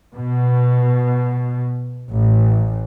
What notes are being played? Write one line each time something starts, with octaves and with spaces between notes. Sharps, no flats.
B2
A1